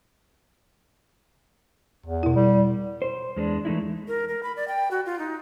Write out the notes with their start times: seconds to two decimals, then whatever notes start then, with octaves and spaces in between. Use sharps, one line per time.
2.06 E2
2.23 B2 E4
2.36 G3
3.02 C5
3.36 E2 G#3 D4
3.65 E3 A3 D#4 E4
4.08 A#4
4.28 A#4
4.43 B5
4.56 D5
4.68 G5
4.91 F#4
5.06 F4
5.19 D#4